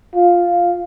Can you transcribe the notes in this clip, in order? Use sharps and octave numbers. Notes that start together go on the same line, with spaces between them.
F4